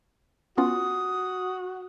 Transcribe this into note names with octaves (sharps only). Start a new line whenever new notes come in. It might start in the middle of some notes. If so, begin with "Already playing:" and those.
B3 C#4 F4 F#4 D#6